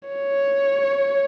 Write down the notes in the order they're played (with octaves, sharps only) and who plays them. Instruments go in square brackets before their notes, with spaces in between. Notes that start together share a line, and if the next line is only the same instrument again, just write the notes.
[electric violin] C#5